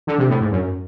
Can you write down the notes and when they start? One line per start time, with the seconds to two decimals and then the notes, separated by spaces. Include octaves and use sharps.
0.07 D3
0.18 C3
0.29 A2
0.41 G#2
0.52 F#2